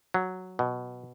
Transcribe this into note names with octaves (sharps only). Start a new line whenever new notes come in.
F#3
B2